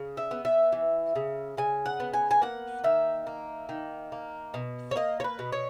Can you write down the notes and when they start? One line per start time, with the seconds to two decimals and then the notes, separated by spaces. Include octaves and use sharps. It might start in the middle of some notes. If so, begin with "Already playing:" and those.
Already playing: C#3
0.17 E5
0.31 B3
0.45 E5
0.72 E3
1.15 C#3
1.57 C#3 G#5
1.86 F#5
2.00 B3
2.13 G#5
2.31 G#5
2.42 A#3 F#5
2.84 D#3 E5
3.27 A#3
3.69 D#3
4.12 A#3
4.54 B2
4.91 C#5
4.96 A#3 D#5
5.20 C#5
5.24 B4
5.39 B2
5.52 C#5